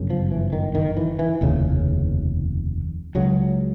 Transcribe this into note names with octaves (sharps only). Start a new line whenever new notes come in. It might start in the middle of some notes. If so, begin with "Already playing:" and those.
Already playing: G1 F#2 C#3
F3
E3
D#3
D#3
E3
E3
F1 D#2 C#3
C#2 C#3 F#3